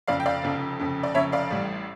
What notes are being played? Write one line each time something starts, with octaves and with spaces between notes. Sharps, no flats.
F1 F2 C#3 D5 F5
G5
D5 F5
F1 F2 C#3
F1 F2 C#3
D5
F1 F2 C#3 C#5 E5
D5 F5
A1 A2 G3